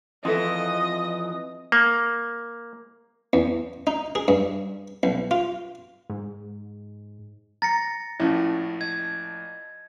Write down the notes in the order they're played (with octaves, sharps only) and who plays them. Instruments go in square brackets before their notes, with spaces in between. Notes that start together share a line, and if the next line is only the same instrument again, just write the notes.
[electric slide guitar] F2 E3 [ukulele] F4 A4 E5 [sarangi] D#5 [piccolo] D#6
[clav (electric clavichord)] A#3
[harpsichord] E2
D#4
G#4
G2
B1
F4
[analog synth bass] G#2
[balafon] A#5 [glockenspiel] A6 A#6 C#7
[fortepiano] A#1 A2 [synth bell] C#4 E4
[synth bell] D#5 [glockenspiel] G#6